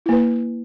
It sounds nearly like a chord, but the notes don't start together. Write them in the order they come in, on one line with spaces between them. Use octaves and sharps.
E4 A#3 B4